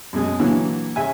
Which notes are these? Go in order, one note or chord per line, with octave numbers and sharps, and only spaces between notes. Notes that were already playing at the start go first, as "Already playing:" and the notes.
F#2 B2 G#3
A#2 D3 E3 F#3
C#3 E5 G#5